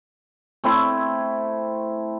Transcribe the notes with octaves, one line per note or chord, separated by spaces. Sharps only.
A3 C4 E4